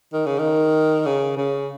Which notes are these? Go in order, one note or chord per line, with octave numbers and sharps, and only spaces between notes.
D#3
C#3
D#3
C#3
C#3